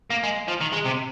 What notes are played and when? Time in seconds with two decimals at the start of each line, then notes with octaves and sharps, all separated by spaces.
0.11 A#3
0.23 G#3
0.48 F3
0.61 D#3
0.73 G#3
0.85 C3